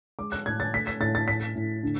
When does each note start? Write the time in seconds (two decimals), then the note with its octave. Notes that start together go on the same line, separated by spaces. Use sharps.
0.19 G#3 D6
0.32 F#6
0.46 A2 G#6
0.60 A6
0.73 A3 B6
0.87 B6
1.00 A2 A6
1.15 A6
1.28 A2 B6
1.55 A2
1.83 D3